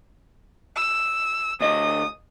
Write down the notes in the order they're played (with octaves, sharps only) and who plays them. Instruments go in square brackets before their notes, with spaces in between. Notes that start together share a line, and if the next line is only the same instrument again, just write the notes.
[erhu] E6
[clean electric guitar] D2 D#5 [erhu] D#6